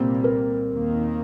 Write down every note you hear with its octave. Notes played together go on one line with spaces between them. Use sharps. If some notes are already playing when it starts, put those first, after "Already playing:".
Already playing: C2 A#2 G3 A#3 C4
A#4
D#2 D#3 A#3